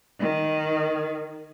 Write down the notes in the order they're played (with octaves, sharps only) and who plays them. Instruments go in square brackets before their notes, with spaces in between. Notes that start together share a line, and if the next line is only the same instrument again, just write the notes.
[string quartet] D#3